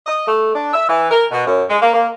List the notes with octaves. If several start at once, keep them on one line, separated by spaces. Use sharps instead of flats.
D#5
A3
D4
E5
E3
A#4
B2
F#2
G#3
A#3
A#3